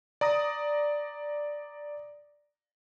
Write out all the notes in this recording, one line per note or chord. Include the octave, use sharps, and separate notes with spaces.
D5 A#5 D#6 A#6